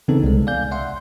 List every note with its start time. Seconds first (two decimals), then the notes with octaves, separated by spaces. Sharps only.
0.08 C#3 E3 B3 C4 D#4 A4
0.24 C2 G#3
0.47 D5 F5 G#5 G6
0.71 D5 E5 F#5 C6